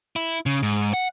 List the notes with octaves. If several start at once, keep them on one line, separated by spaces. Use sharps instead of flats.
E4
C#3
G#2
F#5